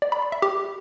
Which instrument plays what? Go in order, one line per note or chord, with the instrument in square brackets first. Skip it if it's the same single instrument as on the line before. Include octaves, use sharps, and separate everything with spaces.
[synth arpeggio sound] D5
B5
C6
E5
G4